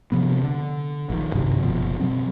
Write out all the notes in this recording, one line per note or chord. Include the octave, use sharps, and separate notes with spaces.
C3 F3 B3
D3
A#1 D#3
G2 C3 D#3 F#3
F#1 B2 F3
B2 F#3 C4